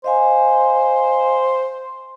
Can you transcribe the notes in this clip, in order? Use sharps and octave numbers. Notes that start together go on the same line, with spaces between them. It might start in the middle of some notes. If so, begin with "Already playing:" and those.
C5 D#5 F5 G#5